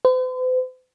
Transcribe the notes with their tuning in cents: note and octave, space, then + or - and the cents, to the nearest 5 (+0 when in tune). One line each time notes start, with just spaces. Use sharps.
C5 -45